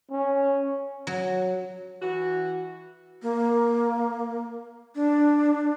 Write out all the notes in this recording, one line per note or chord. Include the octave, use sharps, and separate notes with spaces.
C#4
F#3
E3 F#4
A#3
D4